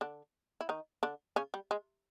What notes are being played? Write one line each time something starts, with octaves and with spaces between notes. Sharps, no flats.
D3 D4
E4
D#3 D#4
D3 D4
C#3 C#4
G3
G#3